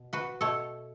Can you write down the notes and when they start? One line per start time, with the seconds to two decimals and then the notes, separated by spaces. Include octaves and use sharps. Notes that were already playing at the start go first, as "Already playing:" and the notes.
Already playing: B2
0.13 F#4 B4
0.41 B2 A3 A4 C#5